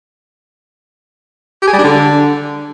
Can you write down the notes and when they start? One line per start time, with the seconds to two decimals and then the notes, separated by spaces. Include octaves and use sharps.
1.62 G4
1.68 G#4
1.73 G3
1.78 D4
1.84 D3